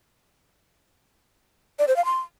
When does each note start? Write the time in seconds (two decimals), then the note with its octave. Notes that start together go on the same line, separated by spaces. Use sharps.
1.79 D5
1.88 C5
1.96 F5
2.05 C6